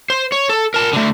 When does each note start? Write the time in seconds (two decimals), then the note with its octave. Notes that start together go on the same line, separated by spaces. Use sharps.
0.10 C5
0.32 C#5
0.49 A4
0.74 A#4 A5
0.93 D3 A3